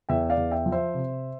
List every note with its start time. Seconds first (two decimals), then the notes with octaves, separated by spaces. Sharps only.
0.09 E2 E5 G5
0.30 D5 F5
0.37 E2
0.51 E5 G5
0.66 F3
0.72 C5 E5
0.94 C3